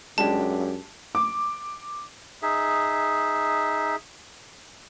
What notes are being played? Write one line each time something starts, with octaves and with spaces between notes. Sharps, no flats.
F#2 G#3 D4 G4 A5
D6
D#4 G#4 E5